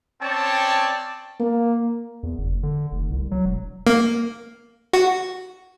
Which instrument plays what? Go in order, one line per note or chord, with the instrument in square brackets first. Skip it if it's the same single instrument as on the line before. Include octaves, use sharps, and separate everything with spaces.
[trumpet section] C4 C#4 C#5 D5 G5 A5
[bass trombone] A#3
[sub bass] E2
F#1
D3
F1
C2
F#3
E1
[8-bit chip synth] A#3
F#4